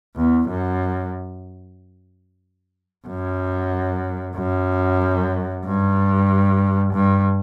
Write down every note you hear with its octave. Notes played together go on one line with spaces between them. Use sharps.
E2
F#2
F#2
F#2
G2
G2